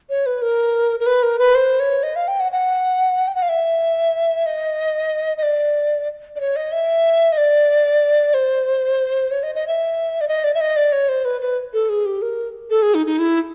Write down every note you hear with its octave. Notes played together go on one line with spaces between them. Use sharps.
C#5
B4
A#4
A#4
B4
A#4
B4
C5
C#5
D#5
F5
G5
F#5
F#5
G5
F#5
F5
E5
D#5
D#5
D5
D5
C#5
D#5
E5
D#5
D5
C5
C#5
D#5
D#5
E5
D5
D#5
D5
E5
D#5
D5
C#5
C5
B4
B4
A4
G#4
G4
A#4
A4
G#4
D#4
D#4
E4